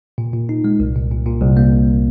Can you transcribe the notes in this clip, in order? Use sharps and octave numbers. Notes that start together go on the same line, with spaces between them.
A#2
A#2
D#4
G#3
C2
A#2
A#2
A#2
C2
A#3